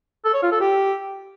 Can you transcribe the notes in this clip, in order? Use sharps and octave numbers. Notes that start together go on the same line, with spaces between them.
A4
C#5
F4
A4
G4